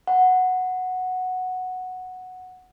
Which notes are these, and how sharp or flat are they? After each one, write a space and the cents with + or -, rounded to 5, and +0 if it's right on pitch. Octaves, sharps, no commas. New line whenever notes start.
F#5 -5 B5 +0